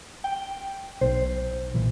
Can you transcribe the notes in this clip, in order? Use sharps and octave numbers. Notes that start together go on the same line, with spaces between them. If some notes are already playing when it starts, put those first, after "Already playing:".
G5
B1 C5
B1 A#2 E3